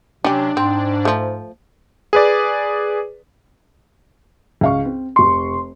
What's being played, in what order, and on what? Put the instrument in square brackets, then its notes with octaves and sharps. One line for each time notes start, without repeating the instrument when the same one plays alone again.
[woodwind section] C3 F#3 [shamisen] C#4 G4 [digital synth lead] D4
[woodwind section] G#2 [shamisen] C4
[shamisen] F3 A3
[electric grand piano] G#4 B4 D5
[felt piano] C#2 F5 C#6
C4
[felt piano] F1 C#6 [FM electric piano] C6